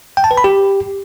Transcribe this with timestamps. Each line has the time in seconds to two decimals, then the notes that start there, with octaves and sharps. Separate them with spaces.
0.17 G5
0.24 A5
0.31 B4
0.38 B5
0.44 G4